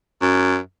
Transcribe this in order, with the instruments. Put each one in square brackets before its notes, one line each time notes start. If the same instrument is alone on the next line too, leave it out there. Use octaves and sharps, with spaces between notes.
[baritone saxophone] F#2